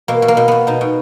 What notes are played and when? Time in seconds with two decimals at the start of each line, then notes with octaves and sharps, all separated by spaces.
0.08 B2 A#3
0.22 B2
0.28 A#3
0.37 B2
0.48 B2 B3
0.67 B2 D#4
0.81 B2